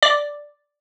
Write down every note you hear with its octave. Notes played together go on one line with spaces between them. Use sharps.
D5